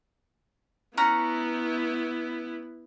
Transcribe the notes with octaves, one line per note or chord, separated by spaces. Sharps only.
B3 C#4 E4 F#5 A#5